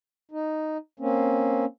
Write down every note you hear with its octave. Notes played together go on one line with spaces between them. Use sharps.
D#4
A#3 C4 C#4